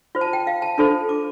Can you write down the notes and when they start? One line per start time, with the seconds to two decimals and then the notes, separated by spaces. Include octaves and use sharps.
0.15 F4 C5
0.21 A5
0.33 G5
0.47 F5
0.62 A5
0.78 D4 F4 A4 C5 A5
1.09 D6